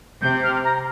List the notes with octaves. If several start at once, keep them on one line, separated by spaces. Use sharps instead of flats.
C3 G6
F6
A#5